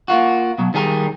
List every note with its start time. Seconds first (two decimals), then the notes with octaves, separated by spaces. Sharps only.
0.08 A#3 F4 F#4
0.58 B2 F#3
0.74 D#3 G3 G#4 A#4